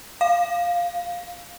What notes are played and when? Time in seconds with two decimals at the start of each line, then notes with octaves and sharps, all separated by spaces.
0.21 F5